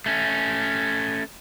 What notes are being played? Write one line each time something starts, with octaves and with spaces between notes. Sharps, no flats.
A3 C#4